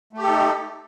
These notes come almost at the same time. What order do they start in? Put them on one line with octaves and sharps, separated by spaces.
A3 G4 A4 D#4